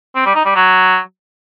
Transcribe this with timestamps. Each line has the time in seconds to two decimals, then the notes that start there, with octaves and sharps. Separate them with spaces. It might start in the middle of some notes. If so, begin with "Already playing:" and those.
0.16 C4
0.25 G3
0.35 D#4
0.45 G3
0.55 F#3